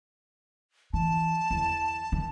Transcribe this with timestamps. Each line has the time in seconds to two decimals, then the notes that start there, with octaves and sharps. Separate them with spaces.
0.93 E3 A5
1.51 E2
2.12 D#3